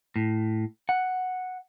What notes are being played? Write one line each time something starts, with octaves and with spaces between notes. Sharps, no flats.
A2
F#5